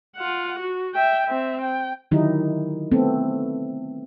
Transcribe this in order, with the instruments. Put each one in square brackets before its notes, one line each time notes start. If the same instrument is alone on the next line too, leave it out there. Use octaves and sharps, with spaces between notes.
[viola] F4 F#5
F#4
E5 G5
C4 E5
G5
[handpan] D3 D#3 F#3 D#4 E4 G4
A3 B3 C4 A4